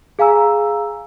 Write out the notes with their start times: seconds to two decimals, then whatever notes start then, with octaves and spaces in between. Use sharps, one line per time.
0.19 G#4 F5 G#5 A#5 E6